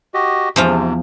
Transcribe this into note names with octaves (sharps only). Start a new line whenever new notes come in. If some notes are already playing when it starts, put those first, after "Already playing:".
F#4 G4 D#5
E2 G#2 C3 F3 F4